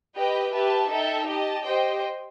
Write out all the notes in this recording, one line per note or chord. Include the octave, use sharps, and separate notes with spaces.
G4 B4 D#5 G5
G4 B4 E5 A5
D#4 A4 E5 G5
G4 D#5 A5
G4 C5 D#5 G5